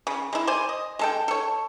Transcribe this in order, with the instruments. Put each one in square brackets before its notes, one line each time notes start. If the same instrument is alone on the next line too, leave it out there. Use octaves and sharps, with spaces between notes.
[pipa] C#3
G#3 E4
C5 D5 G#5
D#5
G#3 A4 G5
A4 C#5